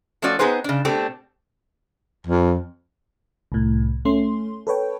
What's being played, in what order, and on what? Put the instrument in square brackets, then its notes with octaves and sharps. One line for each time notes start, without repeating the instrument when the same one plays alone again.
[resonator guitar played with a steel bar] F3 A3 C4 C#4 F#4 D5
B3 C4 D#4 G#4 B4 C5
C#3 D4
B2 A3 C4 D4 G4 A4
[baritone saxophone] F2
[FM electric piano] C2 A2
A3 C#4 C6
A4 B4 C#5 G5